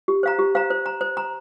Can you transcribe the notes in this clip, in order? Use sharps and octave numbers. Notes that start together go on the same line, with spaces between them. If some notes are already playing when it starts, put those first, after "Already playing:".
G4
C5 F5 A#5
G4
C5 F5 A#5
C5
A#5
C5
A#5